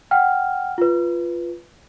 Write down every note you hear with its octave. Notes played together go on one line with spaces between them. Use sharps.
F#5 G5 F6
F4 B4